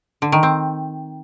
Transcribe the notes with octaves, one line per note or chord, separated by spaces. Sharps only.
D3
D#3
C4